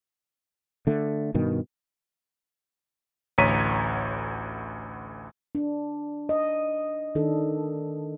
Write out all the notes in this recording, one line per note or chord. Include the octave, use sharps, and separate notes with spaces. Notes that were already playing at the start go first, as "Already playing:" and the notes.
D3 A3
G2 B2 D#3
A1 D2 C#5 A#5 B6 D#7
D4
D#5
D#3 D4 A4